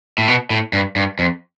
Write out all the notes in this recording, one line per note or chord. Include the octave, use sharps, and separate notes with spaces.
A2
B2
A2
G2
G2
F2